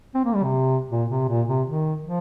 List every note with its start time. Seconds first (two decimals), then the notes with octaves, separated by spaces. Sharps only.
0.15 C4
0.25 A#3
0.35 G3
0.44 C3
0.91 A#2
1.10 C3
1.29 A#2
1.48 C3
1.67 D#3
2.05 F3